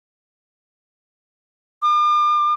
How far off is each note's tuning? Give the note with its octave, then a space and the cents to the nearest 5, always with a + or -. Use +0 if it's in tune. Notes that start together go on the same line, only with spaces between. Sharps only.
D6 +45